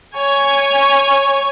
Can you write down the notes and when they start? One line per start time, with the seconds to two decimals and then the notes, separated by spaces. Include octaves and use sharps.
0.16 C#5 G#5